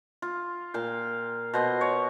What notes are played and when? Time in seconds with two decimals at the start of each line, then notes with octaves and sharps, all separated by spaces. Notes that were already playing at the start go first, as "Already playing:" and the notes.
0.22 F4
0.74 A#2 F5 G5
1.54 B2 C5 D#5
1.81 C#5